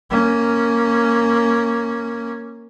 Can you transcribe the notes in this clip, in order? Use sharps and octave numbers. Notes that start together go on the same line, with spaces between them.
A#3 C#4